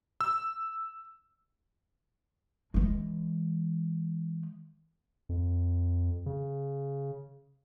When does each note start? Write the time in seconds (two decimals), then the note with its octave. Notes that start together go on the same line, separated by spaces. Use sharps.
0.21 E6
2.74 E3 G#3
5.29 F2
6.26 C#3